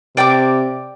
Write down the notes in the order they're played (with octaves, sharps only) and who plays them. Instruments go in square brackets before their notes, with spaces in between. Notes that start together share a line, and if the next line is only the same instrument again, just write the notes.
[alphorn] C3 [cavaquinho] D5 G5 D6